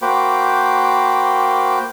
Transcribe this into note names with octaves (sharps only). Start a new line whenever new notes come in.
A#3 F#4 C5 G5 B5 D6